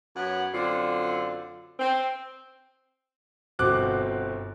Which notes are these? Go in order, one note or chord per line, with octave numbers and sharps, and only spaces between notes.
F#2 B3 C#5 F#5
F#2 D3 C4 F4
C4
G1 B2 C4 D6 F#6